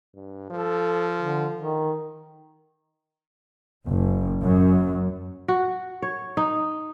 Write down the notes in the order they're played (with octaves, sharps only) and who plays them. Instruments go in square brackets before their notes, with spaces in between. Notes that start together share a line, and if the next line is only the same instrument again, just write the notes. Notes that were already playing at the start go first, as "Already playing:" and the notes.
[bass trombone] G2
[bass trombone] F3 [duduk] A4
[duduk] D3
D#3
[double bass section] F#1
F#2
[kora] F#4
C#5
D#4